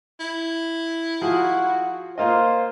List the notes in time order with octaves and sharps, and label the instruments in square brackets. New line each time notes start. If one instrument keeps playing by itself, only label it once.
[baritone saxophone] E4
[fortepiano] F3 G#4 [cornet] F#4
[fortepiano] A#3 F4 D#5 [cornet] C5